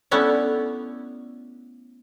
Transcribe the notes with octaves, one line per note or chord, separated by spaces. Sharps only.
A3 B3 C#4 D4 E4